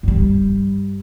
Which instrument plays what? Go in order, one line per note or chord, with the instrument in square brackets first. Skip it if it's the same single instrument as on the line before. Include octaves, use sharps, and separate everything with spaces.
[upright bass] G2 G3